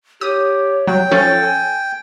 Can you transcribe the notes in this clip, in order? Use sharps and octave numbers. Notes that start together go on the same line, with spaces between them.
G4 C#5 D#6
F#3 G5
F3 C#4 A4
G#5